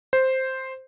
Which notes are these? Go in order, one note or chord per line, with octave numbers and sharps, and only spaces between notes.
C5